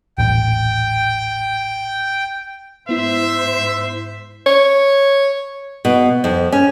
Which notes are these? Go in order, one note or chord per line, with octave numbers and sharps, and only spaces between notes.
D#1 A1 G5
G#2 B3 E4 C5 E5
C#5
B2
F2
C#4